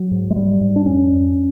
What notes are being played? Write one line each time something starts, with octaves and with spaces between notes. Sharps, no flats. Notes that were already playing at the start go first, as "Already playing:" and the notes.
Already playing: F#3
G#2
G#3
G#2 G3
G#2
D4
F2 C#4
F2